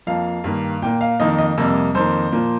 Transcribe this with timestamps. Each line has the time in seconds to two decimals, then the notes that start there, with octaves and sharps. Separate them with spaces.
0.07 F2 F3 A#3 F5
0.44 G2 D#3 A#3
0.82 A#2 A#3 G5
1.01 F5
1.20 F2 D#3 A#3 D#5
1.38 D#5
1.57 F2 C3 G3 A#3
1.95 F2 D#3 A#3 C5
2.32 A#2 F3 A#3